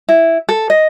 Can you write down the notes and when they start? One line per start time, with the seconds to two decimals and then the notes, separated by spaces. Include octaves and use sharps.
0.09 E4
0.49 A4
0.70 D#5